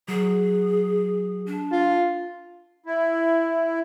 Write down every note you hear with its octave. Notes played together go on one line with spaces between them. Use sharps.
F#3 G#4
D4
F4
E4